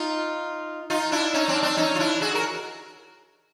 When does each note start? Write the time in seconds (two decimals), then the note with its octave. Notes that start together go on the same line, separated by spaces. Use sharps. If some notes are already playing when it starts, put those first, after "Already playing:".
Already playing: D#4 F4
0.90 D#4 F4
1.12 D4 E4
1.34 C#4 D#4
1.48 C4 D4
1.63 C4 D4
1.77 C#4 D#4
1.95 F4
1.99 D4 E4
2.21 F#4 G#4
2.35 A#4